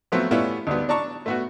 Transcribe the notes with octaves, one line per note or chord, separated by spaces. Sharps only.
F3 F#3 A3 B3 C4
G3 A3 B3 C#4 E4 F4
D2 G#2 G3 B3
D4 A5 A#5 C#6
A3 B3 F#4